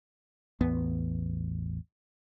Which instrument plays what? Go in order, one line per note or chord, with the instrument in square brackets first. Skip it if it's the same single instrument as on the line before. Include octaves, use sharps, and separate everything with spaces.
[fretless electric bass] A1 E2 B3